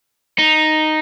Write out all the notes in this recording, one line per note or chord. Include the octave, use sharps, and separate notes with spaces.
D#4